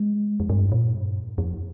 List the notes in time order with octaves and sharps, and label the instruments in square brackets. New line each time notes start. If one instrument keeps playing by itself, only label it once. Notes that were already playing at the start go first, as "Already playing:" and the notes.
Already playing: [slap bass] G#3
[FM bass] F2
G2
A#2
G2
F2
F2